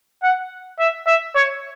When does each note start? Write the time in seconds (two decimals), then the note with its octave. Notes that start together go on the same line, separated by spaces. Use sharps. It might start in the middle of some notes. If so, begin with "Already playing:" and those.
0.23 F#5
0.79 E5
1.07 E5
1.35 C#5